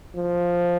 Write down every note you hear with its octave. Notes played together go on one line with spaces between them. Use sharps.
F3